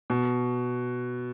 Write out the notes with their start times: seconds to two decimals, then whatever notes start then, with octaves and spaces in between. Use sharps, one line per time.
0.10 B2